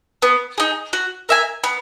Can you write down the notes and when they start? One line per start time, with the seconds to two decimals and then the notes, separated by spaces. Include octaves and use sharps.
0.22 B3
0.58 D#4 G#4
0.93 F#4
1.29 A#4 E5 G#5
1.64 B3